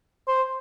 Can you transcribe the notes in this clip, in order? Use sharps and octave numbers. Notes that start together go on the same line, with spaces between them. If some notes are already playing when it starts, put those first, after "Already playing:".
C5